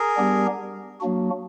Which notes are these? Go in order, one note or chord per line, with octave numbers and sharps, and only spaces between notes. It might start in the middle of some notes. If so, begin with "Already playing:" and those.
Already playing: G#4 A#4
G3 B3 D4 G4
F#3 A#3 D4 F#4